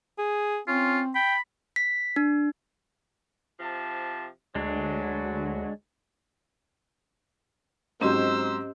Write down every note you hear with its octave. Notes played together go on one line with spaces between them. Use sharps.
G#4
C4 C#4 F4
G5 B5
B6
D4
C3 F3 A5
D2 F#3 G#3 D4
G#2 F#3 C4 C#4 G4 C5 D#5 E6